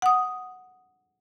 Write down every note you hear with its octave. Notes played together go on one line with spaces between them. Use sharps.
F#5 D#6